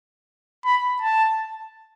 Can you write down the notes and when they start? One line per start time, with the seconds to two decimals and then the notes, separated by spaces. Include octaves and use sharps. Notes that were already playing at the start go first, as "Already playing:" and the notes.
0.65 B5
1.02 A5